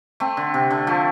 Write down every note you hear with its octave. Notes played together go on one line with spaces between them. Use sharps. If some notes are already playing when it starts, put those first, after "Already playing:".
A3 C4
D3
C3
D3
F3 A3